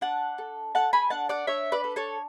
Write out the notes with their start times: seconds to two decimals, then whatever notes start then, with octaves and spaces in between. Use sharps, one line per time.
0.01 D4 F#5 A5
0.38 A4
0.75 A4 F#5 A5
0.93 G#5 B5
1.10 D4 F#5 A5
1.29 D5 F#5
1.47 D4 C#5 E5
1.72 B4 D5
1.84 A4
1.96 A4 C#5